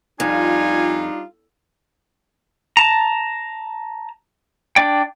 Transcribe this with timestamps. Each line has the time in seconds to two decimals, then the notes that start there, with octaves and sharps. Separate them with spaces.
0.20 F2 G3 D4 D#4 F4 G#5
2.77 A5 A#5
4.76 D4 D5 G5